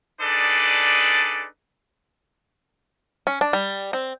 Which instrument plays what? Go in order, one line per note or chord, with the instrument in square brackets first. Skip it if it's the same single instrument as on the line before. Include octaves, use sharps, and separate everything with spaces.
[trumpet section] D4 D#4 G#4 A4 B4 D5
[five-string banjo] C#4
D4
G3
C4